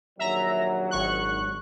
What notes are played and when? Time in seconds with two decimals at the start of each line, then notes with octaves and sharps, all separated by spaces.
0.19 A#1 D#2 F#3 E5 A#5
0.91 G#1 C#6 F#6